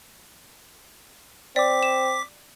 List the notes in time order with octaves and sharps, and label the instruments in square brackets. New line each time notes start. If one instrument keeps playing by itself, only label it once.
[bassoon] C4 [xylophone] D5 [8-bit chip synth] D6 B6
[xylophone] E7